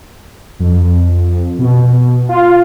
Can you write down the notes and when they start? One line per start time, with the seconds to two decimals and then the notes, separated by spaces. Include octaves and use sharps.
0.60 F2
1.59 B2
2.29 F4